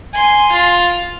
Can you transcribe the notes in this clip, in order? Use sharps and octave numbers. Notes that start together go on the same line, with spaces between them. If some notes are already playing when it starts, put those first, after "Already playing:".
G#5 C6
F4